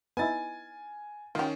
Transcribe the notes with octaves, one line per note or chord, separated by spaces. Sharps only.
B3 D#4 E4 G#5 A6
D#3 C#4 F4 G4